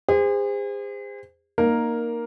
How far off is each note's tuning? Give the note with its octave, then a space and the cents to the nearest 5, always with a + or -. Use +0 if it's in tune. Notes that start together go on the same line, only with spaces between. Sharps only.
G#4 -40 C5 -20
A#3 +5 D#4 -20 A#4 +0